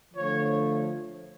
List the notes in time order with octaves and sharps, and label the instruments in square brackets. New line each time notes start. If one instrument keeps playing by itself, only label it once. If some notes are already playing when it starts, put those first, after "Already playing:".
[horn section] D3 F3 A3 C#5